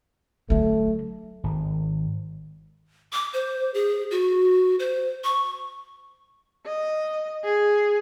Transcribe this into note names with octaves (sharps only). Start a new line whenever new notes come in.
D3 F#3 A3
G#1
D6
C5
G#4
F#4
C5
C#6
D#5
G#4